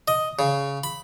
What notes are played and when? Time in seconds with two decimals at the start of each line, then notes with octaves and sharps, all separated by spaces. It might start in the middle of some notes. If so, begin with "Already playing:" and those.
0.08 D#5
0.39 C#3
0.84 B5